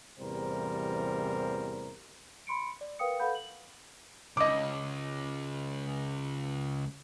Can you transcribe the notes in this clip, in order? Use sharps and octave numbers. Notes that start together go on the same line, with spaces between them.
A1 E2 C3 G3 A#4 C5
B5 C6 C#7 D7
D5
A#4 B4 F5 G5 D#6 C#7
A4 B4 F5 F#5 B5 G6
F#7
C#2 D#5 D6